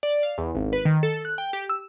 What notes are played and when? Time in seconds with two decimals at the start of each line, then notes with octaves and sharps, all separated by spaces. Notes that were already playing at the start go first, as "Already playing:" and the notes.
0.03 D5
0.23 F5
0.38 E2
0.55 G#1
0.73 B4
0.85 D#3
1.03 A4
1.25 F#6
1.38 G5
1.53 G4
1.69 E6